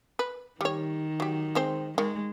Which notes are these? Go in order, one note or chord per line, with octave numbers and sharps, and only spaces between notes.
B4
D#3 G3 C#5
F#3 G4
G#3 C4 C5
D#3 G#3